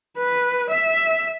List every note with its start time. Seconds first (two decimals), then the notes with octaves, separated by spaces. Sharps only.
0.18 B4
0.70 E5